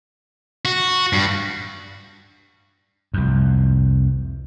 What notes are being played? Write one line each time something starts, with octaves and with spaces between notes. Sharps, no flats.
F#4
G2
C2 F2